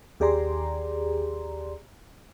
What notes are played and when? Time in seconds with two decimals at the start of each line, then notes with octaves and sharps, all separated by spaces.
0.20 D#2 G4 G#4 D5 A#5 C6